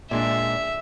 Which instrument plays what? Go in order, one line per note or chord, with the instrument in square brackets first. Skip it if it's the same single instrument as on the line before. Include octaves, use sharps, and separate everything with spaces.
[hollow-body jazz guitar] A#2 G#3 D4 [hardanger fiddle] E5